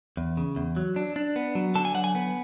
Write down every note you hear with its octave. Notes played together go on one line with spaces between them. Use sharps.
E2
C#3
E2
F#3
D4
D4
B3
F#3
D3 A5
G#5
F#3 F#5
G#5
B3